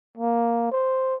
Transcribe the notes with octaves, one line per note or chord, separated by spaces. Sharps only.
A#3
C5